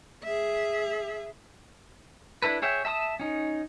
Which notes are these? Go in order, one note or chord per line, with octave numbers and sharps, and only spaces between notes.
G#4 E5
D4 E4 A4 B4
G#4 C#5 E5 G5
E5 A5 C6 D#6
C#4 D#4